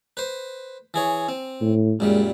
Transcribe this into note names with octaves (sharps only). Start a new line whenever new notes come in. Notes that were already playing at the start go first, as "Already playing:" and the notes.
B4 C5
E3 G#4 C#5
C4
A2
F#2 A#2 G3 G#3